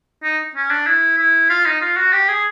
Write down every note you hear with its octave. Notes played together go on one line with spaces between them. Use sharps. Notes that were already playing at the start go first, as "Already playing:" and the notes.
D#4
C#4
D4
E4
E4
F4
D#4
F4
F#4
G4
G#4